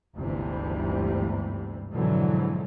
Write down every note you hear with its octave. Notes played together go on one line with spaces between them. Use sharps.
G1 D2 G#2 C3 E3 G3
F2 G#2 B2 D3 E3 F#3